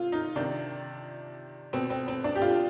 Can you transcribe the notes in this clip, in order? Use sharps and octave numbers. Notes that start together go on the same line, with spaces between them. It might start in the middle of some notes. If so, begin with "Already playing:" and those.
Already playing: C3 F4
D#4
C3 D#3 D4
B2 C4
C4
C4
D4
G4
F4